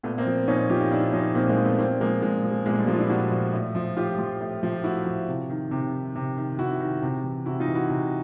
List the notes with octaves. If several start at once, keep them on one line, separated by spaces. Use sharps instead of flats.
A#2 A3 B3
A#3 C4
F3
A#2 C#4 D#4
F3 F4 G4
D#4 F4
A#2 D4 E4
F3 C#4 D#4
A#2 A#3 C4
G#3 A#3
F3
A3 B3
A#2 A#3 C4
F3 G#3 A#3
A#2 G#3
F3
G#3
A#2 G#3
A#3
G3 A3
F3 G#3 A#3
F4
D4 E4
A#2 E4 F#4
F3
A2
F3
A2 F4 G4
F3
A2
F3
A2 E4 F#4
F3
C3
D#3
C3
D#3
C3
D#3
C3 E4 F#4
D#3
C3
E3
C3 E4 F#4
D#4 F4
E3
E4 F#4
C3